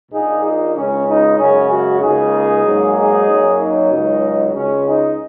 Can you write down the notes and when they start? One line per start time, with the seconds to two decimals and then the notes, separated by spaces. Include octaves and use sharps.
0.12 A#1 A#2 A#3 D#4 G#4
0.43 D#4
0.75 C#2 C#3 G#3 C#4
1.06 D#4
1.37 F#2 C#3 G#3 C#4
1.69 C#4 F#4
2.00 C#2 C#3 A#3 D#4 G#4
2.64 G#2 F#3 A#3
2.96 D#4 G#4
3.27 F#2 F#3 A#3
3.59 D#4
3.91 C#2 C#3 F#3
4.54 C#2 C#3 G#3 C#4
4.85 D#4